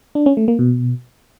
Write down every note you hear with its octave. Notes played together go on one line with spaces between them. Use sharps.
D4
C#4
A3
A#3
B2